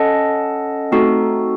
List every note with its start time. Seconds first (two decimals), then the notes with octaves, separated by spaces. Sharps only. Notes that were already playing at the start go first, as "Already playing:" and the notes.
Already playing: C#4 A4 D#5 F#5 A5
0.92 A3 C4 D#4 F#4 A4